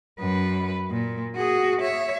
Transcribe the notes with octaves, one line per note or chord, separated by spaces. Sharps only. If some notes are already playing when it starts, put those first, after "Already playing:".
F#2 B4
A#2
F#4 G#4
C#5 E5